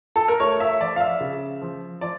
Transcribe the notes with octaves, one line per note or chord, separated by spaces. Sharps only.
A4
A#4
A3 C#5
E5
F3 D5
F5
E5
C#3
F3
F3 D5